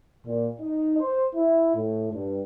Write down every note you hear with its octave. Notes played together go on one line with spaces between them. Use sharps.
A#2
D#4
C5
E4
A2
G2